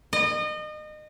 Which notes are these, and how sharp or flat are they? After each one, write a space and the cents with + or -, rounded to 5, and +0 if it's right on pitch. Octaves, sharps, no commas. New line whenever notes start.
D#5 -30